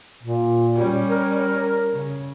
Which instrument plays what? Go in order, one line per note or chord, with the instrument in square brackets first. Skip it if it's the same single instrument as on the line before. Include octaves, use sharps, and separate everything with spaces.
[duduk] A#2
[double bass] G3 C#4
[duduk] A#4
[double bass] C#3